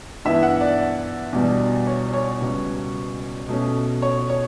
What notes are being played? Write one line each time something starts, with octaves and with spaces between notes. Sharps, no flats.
G2 E3 B3 E4 E5
F#5
D5
E2 B2 G3 D4
C#5
C#5
C#2 B2 G3 B3
B2 A3 C#4
C#5
C#5